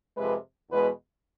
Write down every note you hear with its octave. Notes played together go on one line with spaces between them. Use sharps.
F2 C3 G#3 B4
E2 B2 G#3 B4